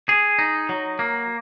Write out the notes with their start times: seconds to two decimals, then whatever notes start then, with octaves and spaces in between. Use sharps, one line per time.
0.09 G#4
0.39 D#4
0.69 F#3
0.99 A#3